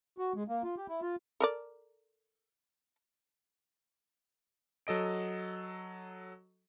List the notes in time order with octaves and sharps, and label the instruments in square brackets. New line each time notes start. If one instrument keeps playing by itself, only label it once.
[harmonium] F#4
G#3
A#3
F4
G4
E4
F4
[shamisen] A4 A#4 D5
[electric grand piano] F#3 A4 D#5 D7